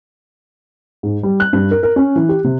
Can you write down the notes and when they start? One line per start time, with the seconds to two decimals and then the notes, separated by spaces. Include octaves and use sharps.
1.03 G#2
1.23 G3
1.40 F#6
1.53 G2
1.71 A#4
1.83 A#4
1.96 C#4
2.16 E3
2.29 G4
2.44 C3